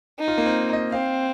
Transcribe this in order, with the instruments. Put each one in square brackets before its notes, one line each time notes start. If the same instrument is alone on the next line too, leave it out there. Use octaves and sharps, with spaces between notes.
[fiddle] D#4
[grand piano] F4
A#3
C4
D#5
[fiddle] C4 [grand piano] F5